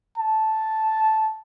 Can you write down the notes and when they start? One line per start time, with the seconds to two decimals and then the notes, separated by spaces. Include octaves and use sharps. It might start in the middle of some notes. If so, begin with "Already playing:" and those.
0.18 A5